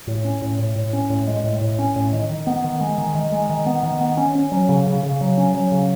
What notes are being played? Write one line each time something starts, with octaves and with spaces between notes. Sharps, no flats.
A2
C#4
A2
A2
A2
C#4
A2
G#3
A2
A2
C#4
A2
D#3
D#3
B3
D#3
G#3
D#3
D#3
G#3
D#3
B3
D#3
B3
C#4
C#4
F#3
C#3
C#3
C#3
F#3
C#4
F#3
C#3